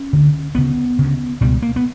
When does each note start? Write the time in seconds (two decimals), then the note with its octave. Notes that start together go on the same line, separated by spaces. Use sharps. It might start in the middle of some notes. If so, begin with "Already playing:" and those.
Already playing: C#4
0.13 D2 D3
0.55 D2 C#3 B3
0.99 D2 C#3
1.41 C#2 B2 G3
1.62 A#3
1.76 B3